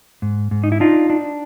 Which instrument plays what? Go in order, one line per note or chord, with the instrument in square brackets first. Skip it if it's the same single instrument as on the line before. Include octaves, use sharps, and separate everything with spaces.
[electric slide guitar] G#2
G#2
D#4
E4
D4 D#4 F4
D4